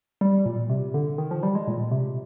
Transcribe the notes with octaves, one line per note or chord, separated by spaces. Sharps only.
G3
A#2
C3
D3
D#3
F3
G3
G#3
A#2
C3